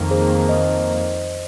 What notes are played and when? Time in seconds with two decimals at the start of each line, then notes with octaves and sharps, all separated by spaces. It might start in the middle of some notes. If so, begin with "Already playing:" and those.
Already playing: F2 D#3 A#3
0.11 G#4 C5
0.49 C5 D#5